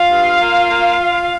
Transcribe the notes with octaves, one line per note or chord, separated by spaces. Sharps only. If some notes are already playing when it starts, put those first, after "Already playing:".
Already playing: F4 F5
G2
A#3
A#3